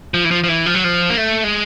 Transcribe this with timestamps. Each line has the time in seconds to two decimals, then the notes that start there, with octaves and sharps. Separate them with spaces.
0.14 F3
0.25 E3
0.31 F3
0.44 F3
0.48 E3
0.66 F3
0.74 F#3
0.84 F3
1.10 A#3
1.17 A3
1.44 G#3